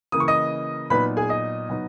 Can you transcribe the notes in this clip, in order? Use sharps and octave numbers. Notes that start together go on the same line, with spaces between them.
C#3 E3 A#3 D#6
C#6
D#5 D#6
A#2 F#3 B3 D#4 B4 B5
G#4 G#5
D#5 D#6
B2 F#3 B3 D#4